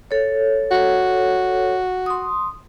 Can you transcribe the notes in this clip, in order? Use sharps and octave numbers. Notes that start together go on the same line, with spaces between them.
A4 C#5
F#4
C6 D#6